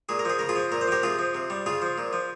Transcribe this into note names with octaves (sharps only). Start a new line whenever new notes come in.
A#2 G#4
A#4
F3 G#4
C#3 A#4
F4 G#4
F3
A#2 A#4
C5
F3 G4 A#4
C3 F4 G#4
F3
C3
G3
C#3 F4 G#4
F3
A#2
F3